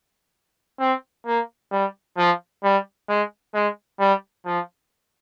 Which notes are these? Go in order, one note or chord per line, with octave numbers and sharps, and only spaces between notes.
C4
A#3
G3
F3
G3
G#3
G#3
G3
F3